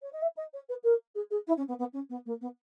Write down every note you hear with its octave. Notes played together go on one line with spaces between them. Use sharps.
C#5
D#5
E5
D#5
C#5
B4
A#4
G#4
G#4
E4
C#4
B3
B3
C#4
B3
A#3
B3